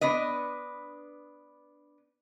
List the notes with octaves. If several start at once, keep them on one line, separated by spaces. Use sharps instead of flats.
B3 D4 B4 D#5